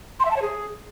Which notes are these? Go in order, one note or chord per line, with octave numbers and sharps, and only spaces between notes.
C6
E5
A5
C#5
G#4